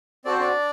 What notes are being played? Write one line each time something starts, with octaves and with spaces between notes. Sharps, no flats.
C4 F#4 A4 D5
C5
D4 D5